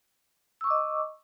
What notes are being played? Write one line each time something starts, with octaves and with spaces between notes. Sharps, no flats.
D#5 C#6 D6 E6